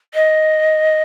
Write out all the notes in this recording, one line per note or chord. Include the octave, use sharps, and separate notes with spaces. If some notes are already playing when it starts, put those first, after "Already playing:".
D#5